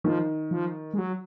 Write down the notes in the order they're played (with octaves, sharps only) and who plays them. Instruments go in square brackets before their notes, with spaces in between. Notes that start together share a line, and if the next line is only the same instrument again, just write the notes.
[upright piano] D#3 [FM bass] F3
[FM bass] F3
G#3
F#3